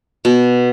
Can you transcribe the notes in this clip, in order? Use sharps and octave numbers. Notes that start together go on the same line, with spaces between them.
B2